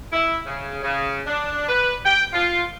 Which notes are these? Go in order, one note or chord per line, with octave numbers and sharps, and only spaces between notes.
E4
C#3
C#3
D4
B4
G5
F4